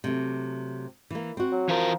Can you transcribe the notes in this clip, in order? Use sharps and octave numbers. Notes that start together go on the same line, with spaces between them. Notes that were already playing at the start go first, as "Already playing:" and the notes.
C3 F#3 A3
E3 A#3
C4 F#4
F#3
E3 F3 A#4